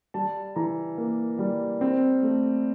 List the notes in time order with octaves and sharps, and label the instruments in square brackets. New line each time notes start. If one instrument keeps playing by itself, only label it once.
[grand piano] G3 A5
E3 A#5
A#3
G3
C4
A3